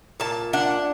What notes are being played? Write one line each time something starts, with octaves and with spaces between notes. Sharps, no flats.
A#2 A5
D4 F#5